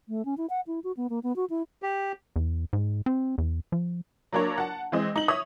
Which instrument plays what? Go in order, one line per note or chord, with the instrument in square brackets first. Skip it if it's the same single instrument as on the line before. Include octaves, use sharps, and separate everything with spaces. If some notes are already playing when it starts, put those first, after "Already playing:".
[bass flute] A3
C#4
E4
F#5
E4
F#4
B3
A#3
B3
F#4
E4
[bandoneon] G4
[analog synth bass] E2
G#2
C4
E2
F3
[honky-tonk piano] F#3 A#3 D4 A#4 C#5
F#5 A5
E3 G#3 C4 D#5
D#4 F#7
C#5 E5 D#6